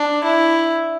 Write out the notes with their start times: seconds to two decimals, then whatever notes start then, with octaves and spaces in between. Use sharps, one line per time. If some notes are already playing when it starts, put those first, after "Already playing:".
Already playing: D4
0.24 E4